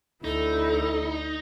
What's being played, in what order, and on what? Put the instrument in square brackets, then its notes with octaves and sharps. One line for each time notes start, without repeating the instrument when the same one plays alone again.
[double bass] D2 [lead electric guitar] D#4 [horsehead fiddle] E4 [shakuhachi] A4